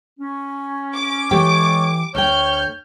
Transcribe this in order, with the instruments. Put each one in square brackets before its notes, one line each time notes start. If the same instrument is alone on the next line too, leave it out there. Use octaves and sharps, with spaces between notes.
[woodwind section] C#4
[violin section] D6
[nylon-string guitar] E3 G4 G5 [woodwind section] G#3 A4 C#5
[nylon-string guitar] D2 G5 [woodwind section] C#5 [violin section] F6 G6